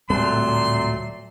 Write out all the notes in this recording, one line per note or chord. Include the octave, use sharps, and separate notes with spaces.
D1 A#2 F#3 G3 A3 C4 C6